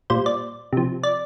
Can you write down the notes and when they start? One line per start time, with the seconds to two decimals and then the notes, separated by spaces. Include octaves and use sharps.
0.10 A#2 G3 C5
0.26 D5
0.73 C3 F3
1.03 D5